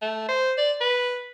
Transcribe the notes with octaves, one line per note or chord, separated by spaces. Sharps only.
A3
C5
D5
B4